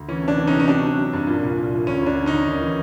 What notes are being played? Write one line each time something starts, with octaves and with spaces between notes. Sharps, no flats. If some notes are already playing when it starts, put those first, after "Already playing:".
Already playing: D2
E3 C#4
C3
D4
E3
C3 C#4 D#4
C#4
F#3 D4
F#3
F#3
G2
A#2
C2
A#2
F3
D2 C#4
D2 D4
D3
D2 C#4 D#4
D#2
E3